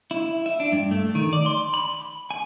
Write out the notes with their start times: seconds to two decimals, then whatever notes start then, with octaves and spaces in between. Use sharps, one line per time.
0.11 E4
0.46 E5
0.60 D4
0.72 G2
0.91 A3
1.15 D#3
1.33 D5
1.46 C6
1.74 B5
2.31 G#5